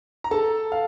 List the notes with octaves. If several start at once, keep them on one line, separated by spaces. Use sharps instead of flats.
A#5
A4 A5
F5